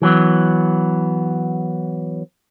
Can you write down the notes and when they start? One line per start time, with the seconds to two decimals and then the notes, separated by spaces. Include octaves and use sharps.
0.02 E3 F#3 B3